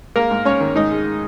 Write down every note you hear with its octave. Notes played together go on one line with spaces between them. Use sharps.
G#3 A#3 A#4
G#2
G#2 C#4 C#5
D#3
G#2 D#4 D#5
G#3